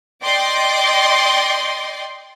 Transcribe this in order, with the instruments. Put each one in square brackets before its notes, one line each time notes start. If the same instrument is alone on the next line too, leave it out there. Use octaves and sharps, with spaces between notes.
[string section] D5 D#5 G5 C6 D6